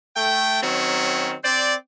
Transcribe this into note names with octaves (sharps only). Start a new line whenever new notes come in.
A3 G5
D#3 F#3 C4 C#4
C4 C5 D5